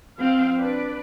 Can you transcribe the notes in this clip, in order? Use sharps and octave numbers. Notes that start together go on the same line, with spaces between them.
F3 C4 F5
D4 B4 D5